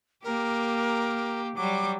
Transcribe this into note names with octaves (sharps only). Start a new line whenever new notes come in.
A#3 G4 A#4
F#3 G3 D6